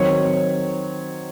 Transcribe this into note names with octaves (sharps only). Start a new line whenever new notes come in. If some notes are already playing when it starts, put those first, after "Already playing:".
Already playing: D#3 F#3 C4 C#5